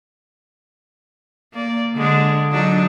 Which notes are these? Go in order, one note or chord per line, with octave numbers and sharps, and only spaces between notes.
A#3 D5
D3 G#3 D4
F#3 D4 D#4